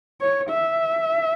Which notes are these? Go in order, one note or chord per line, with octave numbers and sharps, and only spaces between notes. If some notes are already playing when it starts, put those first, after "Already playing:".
C#5
E5